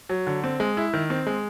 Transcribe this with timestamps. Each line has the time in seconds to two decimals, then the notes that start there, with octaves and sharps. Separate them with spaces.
0.09 F#3
0.27 D3
0.44 C4
0.60 G#3
0.77 E4
0.93 D#3
1.10 C4
1.27 G#3